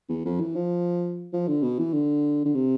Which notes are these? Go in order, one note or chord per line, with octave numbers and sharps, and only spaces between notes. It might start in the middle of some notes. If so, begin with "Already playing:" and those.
E2
F2
E3
F3
F3
D3
B2
E3
D3
D3
C3